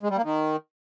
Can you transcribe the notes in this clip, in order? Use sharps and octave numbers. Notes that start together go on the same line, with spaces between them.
G#3
G3
A#3
D#3